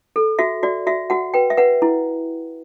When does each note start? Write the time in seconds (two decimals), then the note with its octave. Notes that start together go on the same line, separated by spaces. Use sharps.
0.16 A4
0.39 F#4 E5
0.63 F#4 D5
0.87 F#4 E5
1.10 F#4 F#5
1.34 B4 G5
1.50 E5
1.57 B4 F#5
1.82 E4